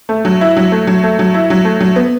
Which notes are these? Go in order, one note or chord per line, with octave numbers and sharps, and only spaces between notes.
A3
F#3
E4
F#3
A3
F#3
A3
F#3
E4
F#3
A3
F#3
B3